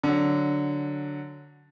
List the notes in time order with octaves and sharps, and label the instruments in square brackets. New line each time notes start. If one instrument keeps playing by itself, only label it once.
[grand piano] D3 F#3